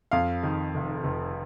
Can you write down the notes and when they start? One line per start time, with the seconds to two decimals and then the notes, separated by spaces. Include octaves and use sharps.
0.11 F2 F5
0.43 D#3
0.74 F1
1.04 F1